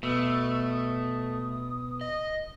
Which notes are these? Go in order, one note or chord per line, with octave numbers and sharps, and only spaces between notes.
B2 A3 E6
D#6
D#5